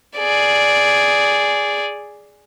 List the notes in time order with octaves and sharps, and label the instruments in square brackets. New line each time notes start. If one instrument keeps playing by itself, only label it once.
[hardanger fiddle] G#4 D5